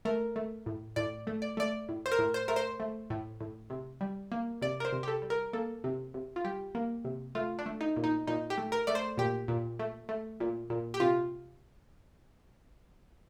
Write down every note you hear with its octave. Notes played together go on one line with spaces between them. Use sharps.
A3 A#4
A3
A2
A2 D5
A3
D5
A3 D5
A2
C5
A#4
A2
C5
A3 A#4
C5
A3
A2
A2
C3
G3
A#3
C3 D5
A#4
C5
C3
G4
A4
G3
A#4
A#3 A4
C3
C3
F4
G3 G4
A#3
C3
A3 F4
D4
A3
D#4
A#2
D#4
A#2 D#4
G4
A3
A#4
A3 D5
C5
A#2 G4
A#2
A3
A3
A#2
A#2
G4
C3 F4